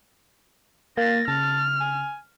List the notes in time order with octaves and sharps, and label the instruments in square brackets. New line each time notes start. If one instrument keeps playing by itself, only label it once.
[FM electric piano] A#3 [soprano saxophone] F5 [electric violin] A6 A#6
[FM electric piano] C#3 [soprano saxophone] A5 [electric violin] F6
[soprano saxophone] G#5